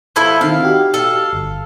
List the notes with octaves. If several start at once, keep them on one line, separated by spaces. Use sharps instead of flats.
F3 E4 A4
D#3 C4 F5
D#4 F#4 G4
A4 F5
G1